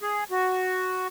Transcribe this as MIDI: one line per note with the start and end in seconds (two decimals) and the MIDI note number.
0.02 0.24 68
0.31 1.08 66